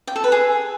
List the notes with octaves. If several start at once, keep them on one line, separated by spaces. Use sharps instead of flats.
G5
A4
B4
G#4